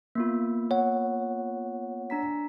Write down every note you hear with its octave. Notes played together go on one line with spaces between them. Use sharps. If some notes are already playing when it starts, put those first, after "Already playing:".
A#3 B3 F4
C#5 F#5
D4 A#5 B6